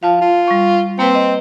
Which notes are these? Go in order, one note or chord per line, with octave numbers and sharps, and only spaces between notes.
F3 F5 A5
F4
G3 C#6
A#3 C4 B4
D#5